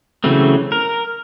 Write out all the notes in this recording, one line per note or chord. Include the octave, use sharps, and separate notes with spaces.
C#3 E3 F#3 A3 C4
A#4